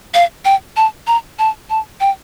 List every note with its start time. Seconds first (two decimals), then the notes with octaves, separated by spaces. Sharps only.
0.14 F5
0.45 G5
0.77 A5
1.07 A#5
1.39 A5
1.70 A5
2.01 G5